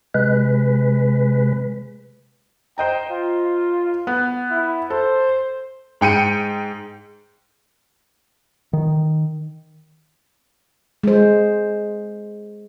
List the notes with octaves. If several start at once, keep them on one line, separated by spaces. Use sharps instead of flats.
C3 G#3 B4
C5 D#5 G5 A#5
F4
B3
E4
A4 C5
G#2 G5 C#7 D#7
D#3
G#3 C5